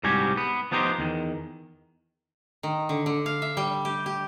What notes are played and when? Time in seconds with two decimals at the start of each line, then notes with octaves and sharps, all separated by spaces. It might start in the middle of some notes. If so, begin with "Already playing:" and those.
0.04 C2 G#2 G3 F#4 G4 G#5
0.37 B3
0.71 F3 B3 D#4 G4 C5
0.98 E2 D#3
2.63 D#3
2.89 D3
3.06 D3
3.26 F5
3.42 E5
3.57 G3
3.85 G4
4.06 G4